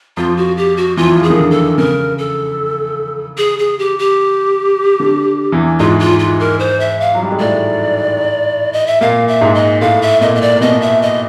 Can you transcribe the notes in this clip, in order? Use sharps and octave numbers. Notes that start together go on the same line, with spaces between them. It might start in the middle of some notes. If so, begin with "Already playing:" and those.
F2 F3 F4
F#4
G4
F#4
E2 E3 F4
F3
E3 G#4
D#3
D3
A4
C#3 A#4
A4
G#4
G#4
G4
G4
D3
E2 E3
G#2 G#3 F4
F4
F4
A#4
C5
E5
F5
F#3
G3
G#3
A2 A3 D5
D#5
E5
A#2 A#3 F5
E5
G#2 G#3
D#5
A2 A3 F5
E5
A#2 A#3 D#5
D#5
D5
A#3
B2 B3 D#5
E5
D#5